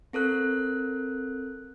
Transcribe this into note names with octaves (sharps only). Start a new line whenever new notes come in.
C4 A4 A#4 F#6